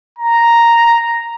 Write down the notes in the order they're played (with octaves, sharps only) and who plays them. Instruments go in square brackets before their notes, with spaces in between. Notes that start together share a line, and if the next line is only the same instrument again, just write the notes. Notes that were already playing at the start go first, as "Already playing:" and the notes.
[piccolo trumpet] A#5